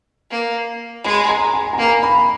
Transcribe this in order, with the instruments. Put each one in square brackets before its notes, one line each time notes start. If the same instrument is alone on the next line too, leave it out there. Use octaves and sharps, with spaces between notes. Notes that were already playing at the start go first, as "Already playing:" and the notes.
[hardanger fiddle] A#3
[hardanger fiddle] G#3 [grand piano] B5
[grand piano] A#5
G#5
A#5
[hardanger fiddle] A#3 [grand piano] G#5
[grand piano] B5